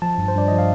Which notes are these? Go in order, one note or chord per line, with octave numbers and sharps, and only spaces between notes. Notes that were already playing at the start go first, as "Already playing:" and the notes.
F3 A5
G2
C5
G2 D5
F3 D#5
F5